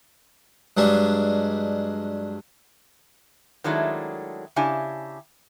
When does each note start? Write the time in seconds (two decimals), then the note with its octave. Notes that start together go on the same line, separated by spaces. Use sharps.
0.77 G2 F#3 G#3 D4
3.64 D#3 F#3 G#3 A3 D4 E4
4.56 C#3 D4 E4 G4 G#5